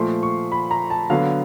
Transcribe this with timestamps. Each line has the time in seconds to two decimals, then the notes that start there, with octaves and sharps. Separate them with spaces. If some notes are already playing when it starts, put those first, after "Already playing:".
Already playing: A#2 F3 A3 C6
0.23 C#6
0.52 B5
0.71 A#5
0.90 A5
1.10 D3 F#3 B3 F5